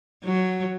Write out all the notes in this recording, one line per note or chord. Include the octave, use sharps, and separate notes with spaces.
F#3